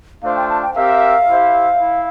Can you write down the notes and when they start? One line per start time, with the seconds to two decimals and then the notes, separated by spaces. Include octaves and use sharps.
0.23 A3 D4 F4 C5 F5
0.36 G5
0.49 A5
0.62 G5
0.75 C4 G4 A#4 E5 F5
1.29 E4 G4 C5 E5
1.80 E4